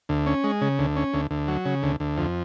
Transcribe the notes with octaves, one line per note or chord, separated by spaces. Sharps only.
D2
C#4
G#3
C#3
D2
C#4
D2
D2
F#3
C#3
D2
D2
F2